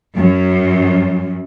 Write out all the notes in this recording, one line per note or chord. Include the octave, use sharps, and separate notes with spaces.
F#2